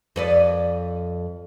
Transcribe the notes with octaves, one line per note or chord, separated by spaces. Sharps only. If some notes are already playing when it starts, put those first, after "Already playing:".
F2 B4 D5